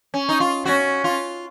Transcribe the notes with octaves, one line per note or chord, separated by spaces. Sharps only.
C#4
D#4
F4
C#4 F#4
F4